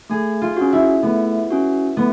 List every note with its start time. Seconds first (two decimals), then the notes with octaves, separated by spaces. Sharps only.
0.10 A3 G#4
0.41 F4
0.57 C#4 F#4
0.73 E4
1.03 A3 B3
1.50 C#4 F#4
1.97 A3 B3